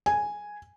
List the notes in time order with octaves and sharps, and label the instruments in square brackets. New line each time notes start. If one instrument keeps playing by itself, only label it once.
[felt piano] G#5